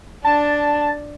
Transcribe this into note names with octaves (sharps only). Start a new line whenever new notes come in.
D4 A5